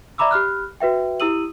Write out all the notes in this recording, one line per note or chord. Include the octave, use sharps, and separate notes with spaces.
D5 E5 A#5 B5 D6 E6
G4 B5 F6 F#6
F#4 B4 E5 G5
E4 G4 D#6 E6 D#7 F#7